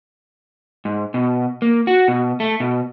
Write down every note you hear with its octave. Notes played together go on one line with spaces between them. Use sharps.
G#2
B2
A#3
F#4
B2
A3
B2